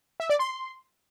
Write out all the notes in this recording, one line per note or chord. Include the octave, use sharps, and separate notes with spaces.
E5
D5
C6